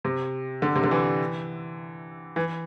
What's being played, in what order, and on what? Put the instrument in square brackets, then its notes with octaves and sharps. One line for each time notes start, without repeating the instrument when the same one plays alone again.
[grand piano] C3
D3
C3
D3
E3
E3